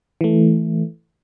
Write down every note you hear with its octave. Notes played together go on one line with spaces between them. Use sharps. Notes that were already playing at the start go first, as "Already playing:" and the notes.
E3 A3